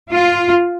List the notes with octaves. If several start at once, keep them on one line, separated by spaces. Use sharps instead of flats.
F4